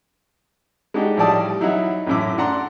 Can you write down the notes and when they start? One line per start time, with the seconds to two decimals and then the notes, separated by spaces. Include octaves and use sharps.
0.94 G#3 D4 D#4 F#4 G4
1.17 A2 F3 G3 D5 A5 D#6
1.61 F#3 D#4 E4 E5 F#5
2.07 A1 F#2 A2 D6
2.38 D4 F#5 A#5 C6